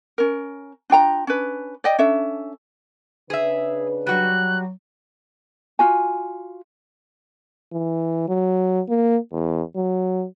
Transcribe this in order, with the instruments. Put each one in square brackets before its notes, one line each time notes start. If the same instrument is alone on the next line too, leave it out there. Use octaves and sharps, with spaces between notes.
[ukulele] C#4 A#4
D4 F4 G5 A#5
C#4 D4 B4
D5 D#5 G5
C#4 D4 A4 E5
[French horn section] C#3 D4 B4 [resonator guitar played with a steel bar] G#4 E5
[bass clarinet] F#3 [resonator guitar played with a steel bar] G3 F#4 [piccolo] F#6
[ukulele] F4 F#4 G#5
[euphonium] E3
F#3
A#3
E2
F#3